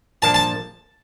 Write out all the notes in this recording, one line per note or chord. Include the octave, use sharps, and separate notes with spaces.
A#2 F3 A#3 D4 A5
A5